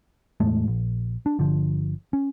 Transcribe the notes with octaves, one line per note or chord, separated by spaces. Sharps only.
E2 A2 G#3 A3
A#1
D4
G1 D3 F3
C#4